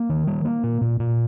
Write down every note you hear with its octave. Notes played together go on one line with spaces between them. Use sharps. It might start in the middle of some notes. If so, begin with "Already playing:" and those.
Already playing: A#3
D#3
G3
A#3
A#2
A#2
A#2